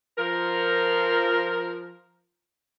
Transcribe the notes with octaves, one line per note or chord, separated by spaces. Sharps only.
F3 A#4